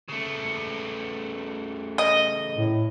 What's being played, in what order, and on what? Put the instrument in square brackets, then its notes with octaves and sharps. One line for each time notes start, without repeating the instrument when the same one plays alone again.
[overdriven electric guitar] C#3 A3
[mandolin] D#5
[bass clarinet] A2